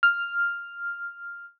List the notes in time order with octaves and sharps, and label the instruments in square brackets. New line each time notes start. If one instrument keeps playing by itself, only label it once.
[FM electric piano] F6